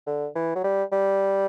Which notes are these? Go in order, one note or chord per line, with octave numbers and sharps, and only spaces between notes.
D3
E3
F#3
G3
G3